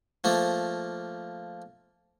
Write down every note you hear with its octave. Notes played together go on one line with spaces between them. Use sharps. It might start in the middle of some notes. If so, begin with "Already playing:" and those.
F3 A3 A#3